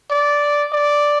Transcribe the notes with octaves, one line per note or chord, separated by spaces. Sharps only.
D5
D5